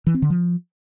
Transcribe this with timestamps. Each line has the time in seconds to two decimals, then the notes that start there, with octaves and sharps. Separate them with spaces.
0.07 E3
0.14 C4
0.22 D3
0.30 F3